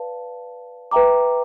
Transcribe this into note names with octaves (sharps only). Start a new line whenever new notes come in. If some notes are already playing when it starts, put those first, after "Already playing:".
Already playing: B4 D5 F5 A5
B4 E5 G5 A#5 D6